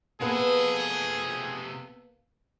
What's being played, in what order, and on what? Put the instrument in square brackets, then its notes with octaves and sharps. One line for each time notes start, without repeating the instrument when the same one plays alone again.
[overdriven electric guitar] C3 A4 [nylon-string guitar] A#3 B3 B4 [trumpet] G#4